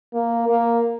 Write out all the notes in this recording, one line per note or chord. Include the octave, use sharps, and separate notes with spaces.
A#3
A#3